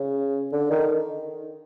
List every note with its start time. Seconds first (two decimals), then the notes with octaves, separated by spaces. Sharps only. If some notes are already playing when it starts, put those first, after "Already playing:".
Already playing: C#3
0.53 D3
0.71 D#3